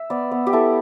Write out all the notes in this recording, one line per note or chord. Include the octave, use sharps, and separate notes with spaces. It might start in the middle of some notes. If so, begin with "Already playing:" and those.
Already playing: E5
B3 D5
B3
G4
E4 A4